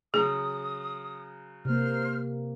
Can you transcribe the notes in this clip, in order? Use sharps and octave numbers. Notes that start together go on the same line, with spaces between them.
C#3 F#3 G#4 D#6
C3 A#3 C5 F6